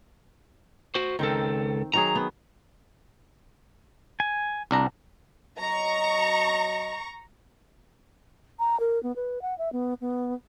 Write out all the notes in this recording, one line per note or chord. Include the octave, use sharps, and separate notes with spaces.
F#4 C5
C#2 D#3 C4 A4 A#4
D#3 F#3 G#4 A#5
B3
G#5
C2 D4 A#5
F#3 D#5 A#5 C#6
A#5
A#4
B3
B4
F#5
E5
B3
B3